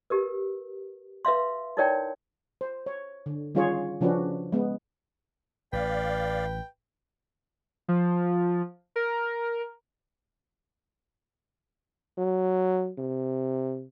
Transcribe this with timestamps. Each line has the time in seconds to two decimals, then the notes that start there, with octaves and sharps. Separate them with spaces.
0.10 G4 A#4 B4
1.25 B4 E5 F5 C6
1.77 D#4 E4 A#4 C#5 D5 G5
2.61 C5
2.86 C#5
3.26 D3
3.55 D#3 G3 C#4 F4 G#4 C#5
4.01 C#3 F3 C#4 D4 F#4 B4
4.52 G#3 B3
5.73 A1 B4 D5 F5 G5
7.88 F3
8.96 A#4
12.18 F#3
12.98 C3